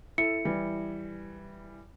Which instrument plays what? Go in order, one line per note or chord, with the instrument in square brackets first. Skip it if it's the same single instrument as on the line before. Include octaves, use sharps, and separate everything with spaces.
[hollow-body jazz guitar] E4 [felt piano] A4 [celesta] C#7
[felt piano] E3 G3